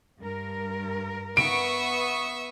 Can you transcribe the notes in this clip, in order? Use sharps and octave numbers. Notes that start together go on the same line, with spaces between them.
G2 A#4
B3 E5 C#6 D#6 D7